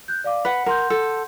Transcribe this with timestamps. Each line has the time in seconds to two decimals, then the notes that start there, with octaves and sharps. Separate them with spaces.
0.08 F#6 G6
0.24 D5 F5 D6
0.45 B4 F#5 B6
0.66 A#4 F#5 C6 G6
0.90 A4